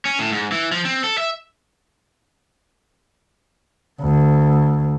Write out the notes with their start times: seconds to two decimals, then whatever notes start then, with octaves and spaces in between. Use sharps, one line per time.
0.05 C#4
0.19 A2
0.31 G#2
0.52 E3
0.72 F3
0.85 C4
1.04 A4
1.18 E5
4.01 D2